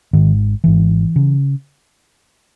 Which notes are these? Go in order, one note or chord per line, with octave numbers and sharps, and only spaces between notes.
G#1 G#2 D#3
G#1 G#2 E3
C#3